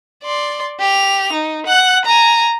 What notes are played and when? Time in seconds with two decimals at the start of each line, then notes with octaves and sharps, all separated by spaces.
0.23 D5 C6
0.80 G4 F7
1.32 D#4
1.66 F#5 F#6
2.05 G#5 A#5